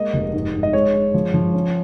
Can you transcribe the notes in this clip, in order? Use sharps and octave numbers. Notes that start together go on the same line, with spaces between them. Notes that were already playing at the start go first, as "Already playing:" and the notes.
Already playing: G#3 A#3 D#5
F1
G#2
G#2
D#5
G#3 C#5
G#3
F3
F3
C#4